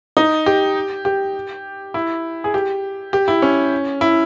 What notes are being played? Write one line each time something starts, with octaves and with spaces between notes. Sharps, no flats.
D#4
G4
G4
E4
G#4
G4
G4
E4
C#4
E4